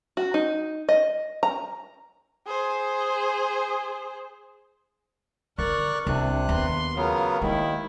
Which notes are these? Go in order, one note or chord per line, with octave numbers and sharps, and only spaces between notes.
F#4
D#4
D#5
A#5
G#4 C5
D3 A#4 D5 C#6 F#6
C2 C3 D4 F#6
D#2 B3 C6
C#3 F#3 B3 F4 A#4
D#2 D#3 G#3 E4